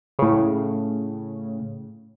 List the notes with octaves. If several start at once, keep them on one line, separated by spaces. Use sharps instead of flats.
A2 C#3